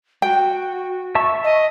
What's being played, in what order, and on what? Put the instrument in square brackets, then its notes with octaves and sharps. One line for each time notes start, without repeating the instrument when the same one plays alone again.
[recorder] F#4 [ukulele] G5
[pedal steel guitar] E5 A5 C#6
[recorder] D#5